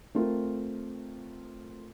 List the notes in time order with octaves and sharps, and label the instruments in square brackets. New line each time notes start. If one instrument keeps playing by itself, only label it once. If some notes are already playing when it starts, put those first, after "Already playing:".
[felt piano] A3 C4 F4 A#4